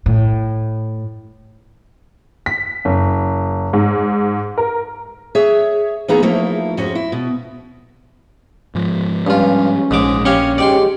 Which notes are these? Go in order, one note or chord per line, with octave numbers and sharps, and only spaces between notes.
A2
B6
F#1
G#2
A#4
G#4 C#5 E5
E3 A#3 B3 D#4 G#4 A#5
F3 A3 A#3 D#4 E4
F2 G#2 C#4 F#4
E4
B2
G#2 F3
G2 C#4 F4
A#1 G#2 G#3 D6
C#4 G4 C#5 F5
G#2 G#3 G4 D5 G5 C6